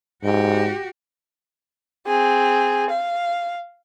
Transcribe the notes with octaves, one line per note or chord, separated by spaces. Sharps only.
G#2 F#4 G4
C4 G#4
F5